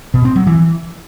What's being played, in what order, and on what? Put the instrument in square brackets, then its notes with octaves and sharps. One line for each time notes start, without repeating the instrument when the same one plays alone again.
[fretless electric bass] B2
C4
F#3
E3